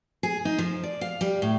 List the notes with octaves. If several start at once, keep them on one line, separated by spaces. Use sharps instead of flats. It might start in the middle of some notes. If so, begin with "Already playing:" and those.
G#4
D#4
F3
D5
F5
G3
A2